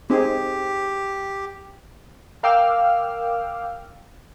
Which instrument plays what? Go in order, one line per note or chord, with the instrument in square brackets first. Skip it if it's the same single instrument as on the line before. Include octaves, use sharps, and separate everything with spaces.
[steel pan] C4 D#4 G#4 [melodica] G4
[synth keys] A#4 F5 G5 D6 E6 F6